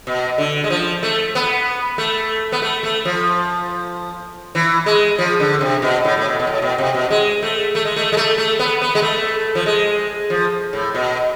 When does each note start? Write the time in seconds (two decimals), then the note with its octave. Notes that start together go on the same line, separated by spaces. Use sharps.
0.07 B2
0.38 D3
0.64 G#3
0.70 F3
1.03 A3
1.35 B3
1.98 A3
2.52 B3
2.62 A3
2.83 A3
3.05 F3
4.55 E3
4.86 G#3
5.18 F3
5.40 D3
5.61 C3
5.82 B2
6.05 A2
6.17 A2
6.26 B2
6.40 B2
6.47 A2
6.62 B2
6.78 C3
6.94 B2
7.10 G#3
7.42 A3
7.75 A3
7.85 G#3
7.96 A3
8.12 G#3
8.17 A3
8.38 A3
8.59 B3
8.82 B3
8.95 G#3
9.02 A3
9.55 F3
9.66 G#3
10.30 F3
10.73 A2
10.95 B2